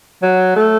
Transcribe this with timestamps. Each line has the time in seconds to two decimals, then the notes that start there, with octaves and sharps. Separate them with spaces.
0.23 F#3
0.56 A3